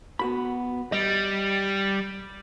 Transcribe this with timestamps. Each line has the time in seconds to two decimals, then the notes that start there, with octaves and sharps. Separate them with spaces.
0.19 B3 F#4 B5
0.92 G3 D#5